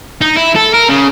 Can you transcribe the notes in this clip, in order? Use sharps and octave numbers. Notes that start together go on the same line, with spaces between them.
D#4
E4
A4
A#4
C#3